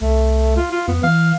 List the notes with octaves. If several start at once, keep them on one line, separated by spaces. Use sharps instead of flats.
C2 A3
F4
F4
F2 B3
E3 F5